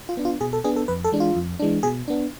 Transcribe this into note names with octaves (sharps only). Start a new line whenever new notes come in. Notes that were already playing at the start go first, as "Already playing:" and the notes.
F4
B3 D4
F4
B2 G#4
A4
B3 D4 G#4
A4
F2 B4
A4
E3 G#3 D4
F4
F2
E3 G#3 D4
B2 G#4
B3 D4